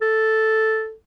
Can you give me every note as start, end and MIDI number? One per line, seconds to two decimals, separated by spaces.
0.02 0.93 69